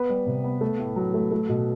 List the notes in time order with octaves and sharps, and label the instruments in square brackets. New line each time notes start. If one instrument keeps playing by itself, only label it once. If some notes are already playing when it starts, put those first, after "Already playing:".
Already playing: [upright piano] B3 B4
G3
C3
B3
A3
A2
F#3
A3
A3
B2